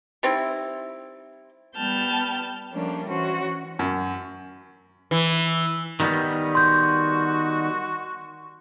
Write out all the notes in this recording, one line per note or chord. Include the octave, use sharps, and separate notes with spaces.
G3 C4 D#4 E4
G3 B3 G5 A5 F6 G6
F3 G3 A3 A#3 C#4 D4
E3 C#4 F#4 C5
F#2
E3
D#3 G3 B3
F#4 C6 G6